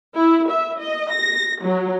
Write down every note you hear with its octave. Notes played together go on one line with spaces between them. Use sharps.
E4
E5
D#5
A#6
F#3